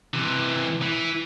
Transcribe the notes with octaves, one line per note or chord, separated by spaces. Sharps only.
C3 E3
E3 E4